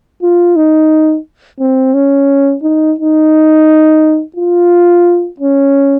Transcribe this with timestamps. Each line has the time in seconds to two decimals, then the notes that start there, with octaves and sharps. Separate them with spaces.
0.23 F4
0.56 D#4
1.60 C4
1.94 C#4
2.63 D#4
2.98 D#4
4.36 F4
5.40 C#4